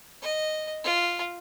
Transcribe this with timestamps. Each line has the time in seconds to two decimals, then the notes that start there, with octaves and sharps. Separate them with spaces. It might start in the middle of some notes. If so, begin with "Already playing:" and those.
0.22 D#5
0.84 F4